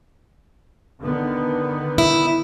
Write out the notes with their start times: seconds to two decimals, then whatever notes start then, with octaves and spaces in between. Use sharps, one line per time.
1.00 D3 D#3 B3
1.98 E4